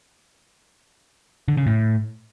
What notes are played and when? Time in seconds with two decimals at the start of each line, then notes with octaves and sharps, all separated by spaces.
1.48 D3
1.57 C#3
1.66 A2